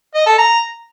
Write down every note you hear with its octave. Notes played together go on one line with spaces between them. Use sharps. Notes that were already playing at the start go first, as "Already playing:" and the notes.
D#5
A4
A#5